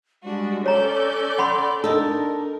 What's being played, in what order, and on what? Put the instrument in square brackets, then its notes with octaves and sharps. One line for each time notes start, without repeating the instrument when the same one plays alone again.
[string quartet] G3 D4 F#4 [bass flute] G#3
[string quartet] C#4 D5 G6 [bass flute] A4 [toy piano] C#5 A#5
[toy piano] F#5 B5 C6
[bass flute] D4 [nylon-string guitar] D#4 A4 [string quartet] A#4